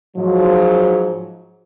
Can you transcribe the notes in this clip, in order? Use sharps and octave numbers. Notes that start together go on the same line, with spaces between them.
G#2 F3 F#3